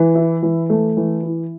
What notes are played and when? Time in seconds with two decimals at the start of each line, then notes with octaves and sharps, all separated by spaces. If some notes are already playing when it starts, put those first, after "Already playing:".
Already playing: E3
0.15 E4
0.43 E3
0.70 A3
0.97 E3
1.23 E4